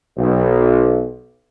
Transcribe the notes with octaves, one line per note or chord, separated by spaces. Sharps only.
B1